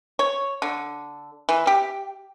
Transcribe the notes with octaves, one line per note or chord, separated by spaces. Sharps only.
C#5
D3
E3
G4